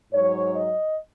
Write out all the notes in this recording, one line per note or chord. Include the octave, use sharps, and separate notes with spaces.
G#2 F#3 C#5
D#5